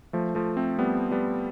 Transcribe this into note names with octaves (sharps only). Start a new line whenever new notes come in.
F3 A3
F3 A3
A3 C4
G3 B3
G3 B3